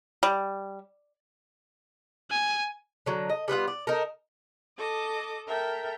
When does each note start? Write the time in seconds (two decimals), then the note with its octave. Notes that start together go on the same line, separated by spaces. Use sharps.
0.23 G3
2.31 G#5
3.06 D3 F#3
3.30 D#5
3.48 G3 B3 F4 F#5
3.68 D5
3.87 D#4 A4 A#4
4.79 A4 D#5 D6
5.47 A4 A#4 E5 G5